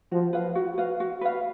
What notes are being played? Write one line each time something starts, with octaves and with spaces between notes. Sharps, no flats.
F3 F#4
B4 F5
F#4
B4 F5
F#4
B4 F5